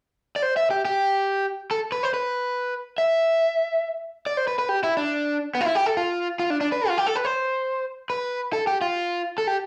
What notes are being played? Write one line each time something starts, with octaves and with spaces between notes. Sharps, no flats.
D5
C5
E5
G4
G4
A4
B4
C5
B4
E5
D5
C5
B4
B4
G4
E4
D4
B3
F4
E4
G4
A4
F4
F4
D4
D4
B4
F4
G4
A4
B4
C5
B4
A4
G4
F4
A4
G4